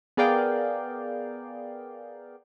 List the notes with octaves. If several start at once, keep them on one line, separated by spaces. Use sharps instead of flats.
B3 G#4 A#4 D5 F5 G5